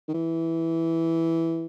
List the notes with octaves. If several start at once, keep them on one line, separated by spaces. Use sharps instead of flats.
D#3
E3